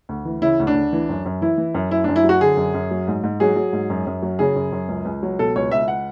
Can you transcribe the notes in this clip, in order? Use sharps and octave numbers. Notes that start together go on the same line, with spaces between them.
D2
E3
C#3 E4
D2
D4
D2
E3
F#2
F#2
E3 E4
E3
F#2
F#2 E4
D4
F#2
E4
F#3 F#4
D3 G#4
F#2
F#2
F#3
G#2
G#2
F#3 G#4
F#3
G#2
F#2
F#2
F#3
C#3 G#4
F#2
F#2
C#2
C#2
F#3
B2 A4
C#2 C#5
C#2 E5
F#5